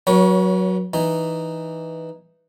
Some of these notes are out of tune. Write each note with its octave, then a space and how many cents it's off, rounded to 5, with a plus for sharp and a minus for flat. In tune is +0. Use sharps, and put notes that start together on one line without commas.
F#3 +0 C#4 +20 B4 -40
E3 +0 D#4 +0